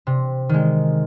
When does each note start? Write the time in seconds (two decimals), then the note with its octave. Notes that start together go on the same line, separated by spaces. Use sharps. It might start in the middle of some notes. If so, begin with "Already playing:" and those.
0.07 C3
0.49 D#3 G#3